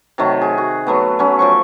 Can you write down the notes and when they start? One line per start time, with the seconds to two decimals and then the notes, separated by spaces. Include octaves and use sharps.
0.18 C3 D#3 F#3 A3
0.42 G#4
0.58 F#4
0.87 F#3 A3 B3
1.19 F#3 C#4
1.39 F3 C5 C#6